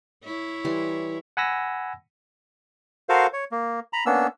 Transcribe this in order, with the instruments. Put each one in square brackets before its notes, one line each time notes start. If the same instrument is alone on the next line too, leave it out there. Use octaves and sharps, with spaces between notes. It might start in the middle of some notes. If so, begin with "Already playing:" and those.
[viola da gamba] E4 C#5
[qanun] E3 G3 C6
[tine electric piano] F#5 G#5 B5 E6 A#6
[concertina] F#4 A4 A#4 C5 F5
C#5
A#3
A#5 B5
A#3 B3 C#4 D4 E6